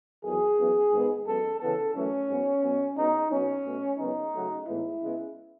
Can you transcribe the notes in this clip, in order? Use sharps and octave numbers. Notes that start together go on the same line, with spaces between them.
E2 D#3 F#3 G#4
F#2 E3 B3
G#2 D#3 G#3 B3
F#2 D#3 G#3 B3 A4
C#3 E3 B3 A4
F#2 E3 A3 C#4
G#2 F#3 B3
B2 F#3 B3
B2 G#3 B3 D#4
B2 F#3 B3 C#4
B2 A3
F#2 C#3 G#3 B3 D#4
C#3 F#3 A3
A2 E3 G#3 B3 E4
C#3 G#3 B3